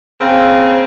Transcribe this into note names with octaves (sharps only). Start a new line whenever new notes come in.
C#3 A#3 C4